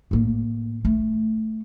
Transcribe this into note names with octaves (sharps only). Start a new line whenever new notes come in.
A2 A#3
A3